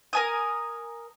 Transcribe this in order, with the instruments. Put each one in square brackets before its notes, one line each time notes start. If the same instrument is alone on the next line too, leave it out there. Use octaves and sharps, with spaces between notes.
[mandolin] A#4 G#5 D#6